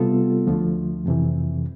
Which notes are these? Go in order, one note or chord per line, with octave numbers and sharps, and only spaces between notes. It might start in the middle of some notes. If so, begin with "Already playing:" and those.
Already playing: C3 G3 B3 F4 A4
D2 D3 F3 A3
F2 C3 E3